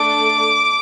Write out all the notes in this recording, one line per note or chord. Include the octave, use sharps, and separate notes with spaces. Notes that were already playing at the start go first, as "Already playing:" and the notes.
Already playing: A3 D4 A4 D6